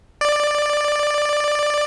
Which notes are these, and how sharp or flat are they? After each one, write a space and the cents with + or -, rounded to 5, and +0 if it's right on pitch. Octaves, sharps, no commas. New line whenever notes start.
D5 +10